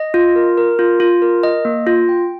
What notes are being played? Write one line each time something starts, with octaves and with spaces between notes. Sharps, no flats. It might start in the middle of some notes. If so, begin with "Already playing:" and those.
Already playing: D#5
F4
A#4
A#4
F4
F4
A#4
D#5
A#3
F4
G5